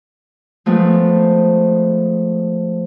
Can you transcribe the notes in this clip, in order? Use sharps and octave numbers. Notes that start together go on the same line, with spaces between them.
F3 G#3 A3 B3 C4